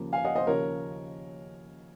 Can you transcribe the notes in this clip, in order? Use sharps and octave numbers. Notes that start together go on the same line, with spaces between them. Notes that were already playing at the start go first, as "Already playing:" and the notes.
Already playing: D#2 C#3 F3 A#3
F5 G#5
D#5 F#5
C5 D#5
D#2 C#3 F3 A#4 C#5